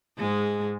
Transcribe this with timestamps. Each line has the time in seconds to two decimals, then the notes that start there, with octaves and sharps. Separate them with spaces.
0.18 G#2 G#3